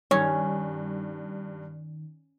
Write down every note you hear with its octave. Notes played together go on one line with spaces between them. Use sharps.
G2 D#3 C#4 C#5